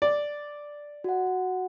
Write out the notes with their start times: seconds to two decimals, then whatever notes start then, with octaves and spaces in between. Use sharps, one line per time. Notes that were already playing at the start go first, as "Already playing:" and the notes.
0.02 D5
1.04 F#4 F#5